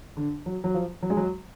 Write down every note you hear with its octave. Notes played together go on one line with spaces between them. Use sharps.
D3
F#3
F#3
F3
F#3
G#3
F#3